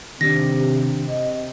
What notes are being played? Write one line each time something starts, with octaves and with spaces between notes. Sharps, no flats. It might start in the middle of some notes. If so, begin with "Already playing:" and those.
C3 D#3 C4 D4 G4 A#6
D#5